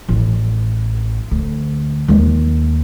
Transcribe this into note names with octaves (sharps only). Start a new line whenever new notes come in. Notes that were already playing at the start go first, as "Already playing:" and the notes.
A1
D2
D#2 G#3